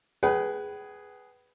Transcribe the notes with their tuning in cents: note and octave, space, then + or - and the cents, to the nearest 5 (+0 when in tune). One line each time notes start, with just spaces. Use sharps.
G#4 +0 B4 +0 G5 -45